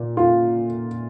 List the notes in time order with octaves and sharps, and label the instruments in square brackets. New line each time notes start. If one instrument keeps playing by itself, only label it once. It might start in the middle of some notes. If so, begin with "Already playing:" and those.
Already playing: [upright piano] A#2
F4